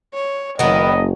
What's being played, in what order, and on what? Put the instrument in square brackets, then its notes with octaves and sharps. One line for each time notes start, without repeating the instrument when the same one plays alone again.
[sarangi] C#5
[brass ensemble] F#1 [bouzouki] D#3 B3 [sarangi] F#3 [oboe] D#5